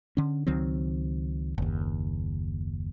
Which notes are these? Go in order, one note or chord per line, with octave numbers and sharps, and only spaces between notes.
D3 C#4
C#2 D#3 F#3 C4
F#1 D#2